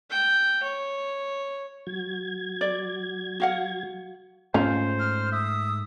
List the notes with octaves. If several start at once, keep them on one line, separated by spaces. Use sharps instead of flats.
G5
C#5
F#3 G#6
D5
F#4 F5 F#5
G#2 A3 C#4 F4 C5
F6
E5 D#6